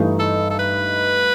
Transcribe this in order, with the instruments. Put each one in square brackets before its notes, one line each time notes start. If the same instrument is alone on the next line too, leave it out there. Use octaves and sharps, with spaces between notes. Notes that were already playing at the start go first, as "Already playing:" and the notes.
Already playing: [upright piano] G2 E3 A3 D#4
[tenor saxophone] A4
A4
B4